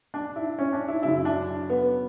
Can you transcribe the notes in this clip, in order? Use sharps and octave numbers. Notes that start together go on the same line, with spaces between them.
D4
E4
C#4
D4
E4
F#2 C#3 F#3 E4
E4
D4
B3